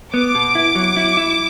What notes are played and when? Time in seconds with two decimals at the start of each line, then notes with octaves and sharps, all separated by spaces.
0.14 B3 D6
0.35 B2
0.55 E4
0.75 F#3
0.97 E4
1.17 E4